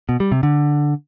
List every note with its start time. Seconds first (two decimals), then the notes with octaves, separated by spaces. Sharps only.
0.09 B2
0.20 G3
0.32 C3
0.43 D3